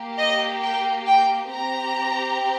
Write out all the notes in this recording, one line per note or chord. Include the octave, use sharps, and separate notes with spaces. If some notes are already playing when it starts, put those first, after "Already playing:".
Already playing: A#3 G4
D#5
G5
G5
C4 G4 A#5